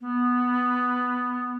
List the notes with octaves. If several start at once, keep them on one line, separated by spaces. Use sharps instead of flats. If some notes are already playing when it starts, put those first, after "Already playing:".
B3